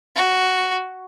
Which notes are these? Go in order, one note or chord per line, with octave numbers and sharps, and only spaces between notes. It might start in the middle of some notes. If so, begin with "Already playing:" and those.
F#4